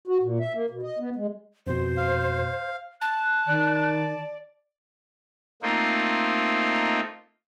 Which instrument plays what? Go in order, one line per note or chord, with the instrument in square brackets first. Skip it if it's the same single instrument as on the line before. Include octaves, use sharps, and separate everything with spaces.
[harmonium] F#4
A#2
E5
A#3
B2
D#5
B3
G#3
[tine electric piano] F2 B2 [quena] C5
[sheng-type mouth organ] F5
[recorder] A5 [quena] F#6
[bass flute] D#3 [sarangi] D5
[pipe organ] A3 A#3 C4 D#4 F4